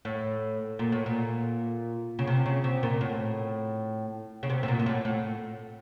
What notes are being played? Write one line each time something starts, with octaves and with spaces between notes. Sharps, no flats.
A2
A#2
A2
A#2
C#3
C3
C#3
C3
A#2
A2
C#3
C3
A2
A#2
A#2
A2
A2